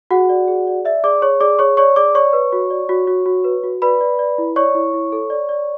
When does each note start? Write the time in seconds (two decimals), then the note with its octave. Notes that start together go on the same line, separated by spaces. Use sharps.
0.11 F#4 G#4 F#5
0.29 D5
0.48 G#4
0.67 D5
0.85 D5 E5
1.04 G#4 D5 D6
1.22 G#4 C#5 C#6
1.41 G#4 D5 D6
1.59 G#4 C#5 C#6
1.77 C#5 D5 C#6
1.96 G#4 D5 D6
2.15 C#5 D5 C#6
2.33 B4
2.52 F#4
2.70 D5
2.89 F#4
3.07 F#4
3.26 F#4
3.44 B4
3.63 F#4
3.82 B4 D5 B5
4.01 D5
4.19 D5
4.38 E4
4.56 C#5 D5 C#6
4.75 E4
4.94 E4
5.12 A4
5.30 D5
5.49 D5